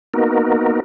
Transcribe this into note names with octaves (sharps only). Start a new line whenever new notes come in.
A#3 B3 D#4 F#4 A#4